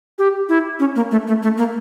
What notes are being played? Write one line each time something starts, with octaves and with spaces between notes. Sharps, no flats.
G4
E4
C#4
A#3
A3
A3
A3
A#3